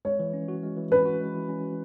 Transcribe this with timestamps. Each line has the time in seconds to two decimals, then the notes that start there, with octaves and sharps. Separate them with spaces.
0.05 G#3 C#5
0.20 E3
0.33 C#4
0.48 F#4
0.63 G#3
0.77 E3
0.92 C#4 B4
1.05 F#4
1.20 G#3
1.34 E3
1.49 C#4
1.64 F#4